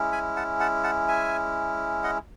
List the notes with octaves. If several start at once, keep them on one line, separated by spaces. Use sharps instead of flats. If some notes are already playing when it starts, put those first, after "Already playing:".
Already playing: G#3 C#4 E4
G#5 B5
F#5 A5
F#5 A5
F#5 A5
E5 G#5
D#5 F#5